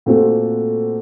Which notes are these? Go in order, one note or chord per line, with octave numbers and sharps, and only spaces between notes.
A#2 A3 C4 F#4 A4